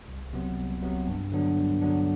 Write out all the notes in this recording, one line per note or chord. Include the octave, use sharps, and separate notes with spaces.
C2
C3 F#3 B3
C2
C3 F#3 B3
G2
D3 F#3 B3 D4
G2
D3 F#3 B3 D4